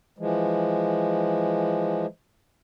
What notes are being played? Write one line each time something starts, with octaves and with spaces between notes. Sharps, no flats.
E3 F3 G#3